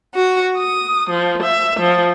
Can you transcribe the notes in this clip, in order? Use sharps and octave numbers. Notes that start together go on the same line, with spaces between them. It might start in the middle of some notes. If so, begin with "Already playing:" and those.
F#4
D#6
F3
E5
F3